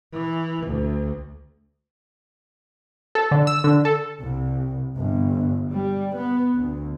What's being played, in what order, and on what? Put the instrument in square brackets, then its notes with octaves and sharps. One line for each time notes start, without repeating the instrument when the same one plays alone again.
[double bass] E3
D2
[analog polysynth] A4
D3
E6
D3
A4
[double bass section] C2
G1
G3
B3
D2